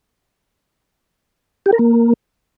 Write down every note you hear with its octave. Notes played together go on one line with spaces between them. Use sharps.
G4
A#4
A#3